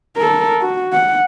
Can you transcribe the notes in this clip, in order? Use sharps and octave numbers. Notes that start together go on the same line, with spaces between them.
A4 A#4
F#4
F#5